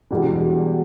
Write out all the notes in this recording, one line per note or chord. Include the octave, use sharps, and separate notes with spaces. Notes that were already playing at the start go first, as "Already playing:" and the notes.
E1 E2 B2 G3